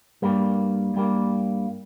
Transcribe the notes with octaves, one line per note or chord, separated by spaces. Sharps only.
G2 G3 A#3
G2 G3 A#3